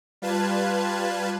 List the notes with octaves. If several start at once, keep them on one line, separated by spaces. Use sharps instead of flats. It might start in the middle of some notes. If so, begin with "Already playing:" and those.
G3 F4 B4 A5 F#6 G#6